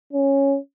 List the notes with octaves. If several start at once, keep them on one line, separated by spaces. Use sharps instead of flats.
C#4